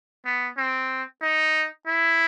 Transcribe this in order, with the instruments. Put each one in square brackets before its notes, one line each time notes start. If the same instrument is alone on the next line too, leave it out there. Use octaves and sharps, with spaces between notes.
[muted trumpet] B3
C4
D#4
E4